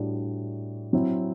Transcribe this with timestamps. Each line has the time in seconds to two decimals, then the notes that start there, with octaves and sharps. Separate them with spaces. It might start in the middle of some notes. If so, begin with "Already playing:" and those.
Already playing: A2 G3 D4 F#4
0.93 F#3 C4 E4